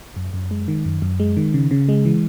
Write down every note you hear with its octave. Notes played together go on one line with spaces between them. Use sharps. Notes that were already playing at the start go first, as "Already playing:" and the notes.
F#2
F#2
G#3
D#3
F#2
F#2
G#3
D#3
C#3
C#3
G#3
E3